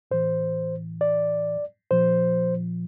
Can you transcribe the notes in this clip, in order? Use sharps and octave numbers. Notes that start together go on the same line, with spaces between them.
A2 E3 C5
D5
A#2 F3 C5